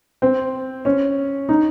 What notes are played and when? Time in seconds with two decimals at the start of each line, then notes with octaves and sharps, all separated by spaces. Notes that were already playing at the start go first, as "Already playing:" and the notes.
0.22 C4
0.85 C#4
1.49 D#4